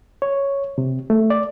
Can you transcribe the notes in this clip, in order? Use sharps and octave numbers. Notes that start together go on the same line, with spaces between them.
C#5
C3
A3
D5